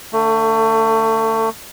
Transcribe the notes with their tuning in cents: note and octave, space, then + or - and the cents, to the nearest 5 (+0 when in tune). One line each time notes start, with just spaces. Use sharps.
D3 +0 A3 +30